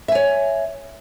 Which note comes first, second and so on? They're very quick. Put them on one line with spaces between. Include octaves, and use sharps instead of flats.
E5 G#5 C#5